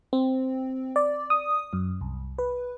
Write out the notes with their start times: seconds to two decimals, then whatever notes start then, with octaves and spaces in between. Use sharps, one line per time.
0.13 C4
0.96 D5
1.30 D#6
1.73 F#2
2.01 C2
2.38 B4